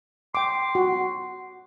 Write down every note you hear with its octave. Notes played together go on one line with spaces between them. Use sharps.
G5 C6 D6
F#4